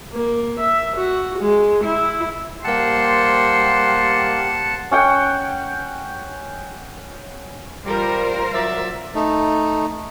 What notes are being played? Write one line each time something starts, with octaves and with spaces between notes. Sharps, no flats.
A#3
E5
F#4
G#3
E4
G3 A#3 G4 C5 F#5 A5
C#4 F#5 G5
G3 F4 A#4 C5
F#3 D5 E5
A3 D#4